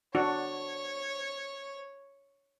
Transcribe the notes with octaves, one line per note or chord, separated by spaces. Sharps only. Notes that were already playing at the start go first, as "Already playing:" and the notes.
D4 F#4 C#5